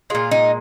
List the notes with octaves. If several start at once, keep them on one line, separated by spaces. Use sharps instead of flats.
A#2 G#3 F4
D#4